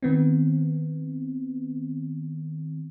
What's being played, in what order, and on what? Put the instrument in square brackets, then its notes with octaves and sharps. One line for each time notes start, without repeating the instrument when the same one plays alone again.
[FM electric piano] D#3 B3 C4